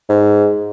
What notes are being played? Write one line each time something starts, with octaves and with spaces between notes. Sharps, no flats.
G#2